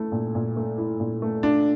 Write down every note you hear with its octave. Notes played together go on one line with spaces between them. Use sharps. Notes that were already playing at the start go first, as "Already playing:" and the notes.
Already playing: A3 E4
A#2
A#2
A3
E4
A#2
A3
D4 F4